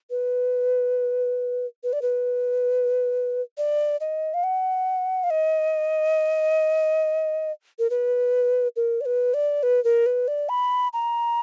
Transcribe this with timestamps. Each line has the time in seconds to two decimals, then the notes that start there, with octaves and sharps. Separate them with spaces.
0.10 B4
1.84 B4
1.93 D5
2.02 B4
3.58 D5
4.01 D#5
4.34 F5
4.44 F#5
5.24 F5
5.30 D#5
7.79 A#4
7.90 B4
8.76 A#4
9.01 D5
9.06 B4
9.34 D5
9.63 B4
9.84 A#4
10.06 B4
10.28 D5
10.49 B5
10.93 A#5